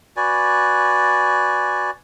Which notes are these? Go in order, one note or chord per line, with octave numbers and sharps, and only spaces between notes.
F#4 B4 D5 G#5